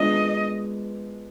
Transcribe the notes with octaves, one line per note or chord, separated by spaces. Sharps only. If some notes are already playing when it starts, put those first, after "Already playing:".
Already playing: G#3 B3 D4 F4 D#5